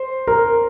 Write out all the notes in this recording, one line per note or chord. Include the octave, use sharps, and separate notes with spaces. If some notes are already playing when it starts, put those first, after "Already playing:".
Already playing: C5
A#4